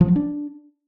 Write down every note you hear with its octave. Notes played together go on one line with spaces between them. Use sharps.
F3
F#3
D4